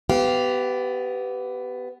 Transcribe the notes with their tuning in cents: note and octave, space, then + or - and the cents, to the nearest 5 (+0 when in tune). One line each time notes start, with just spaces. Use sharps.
B3 +15 G4 -15 F5 +0